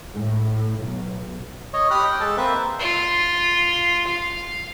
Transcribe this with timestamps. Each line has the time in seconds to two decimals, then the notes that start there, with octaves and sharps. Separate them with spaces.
0.14 A2
0.79 B1
1.74 C#5 D#5
1.91 G4 B5 D#6 F6 F#6
2.05 G5 F#6
2.20 G#3 A4 A5
2.37 A#3 C4 B4 C5 E5 F#6
2.79 F4
4.07 F5